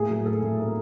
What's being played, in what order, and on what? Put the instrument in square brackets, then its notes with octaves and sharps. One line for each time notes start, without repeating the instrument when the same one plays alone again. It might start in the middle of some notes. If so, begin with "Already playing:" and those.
Already playing: [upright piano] A2 A#3 G#4
F#3
A2 A4
A2
A#3 A#4